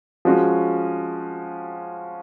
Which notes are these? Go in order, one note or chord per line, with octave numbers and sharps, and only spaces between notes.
F3 G#3 C#4 F#4